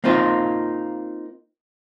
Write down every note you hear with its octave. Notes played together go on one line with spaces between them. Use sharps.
A#3 C4 D#4 F4 C5